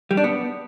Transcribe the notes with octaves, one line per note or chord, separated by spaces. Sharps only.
G3
D4
B3